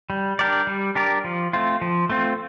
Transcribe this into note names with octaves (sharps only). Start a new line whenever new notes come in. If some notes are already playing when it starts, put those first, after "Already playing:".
G3
D4 G4 A#4 D5
G3
D4 G4 A#4 D5
F3
A3 C4 F4
F3
A3 C4 F4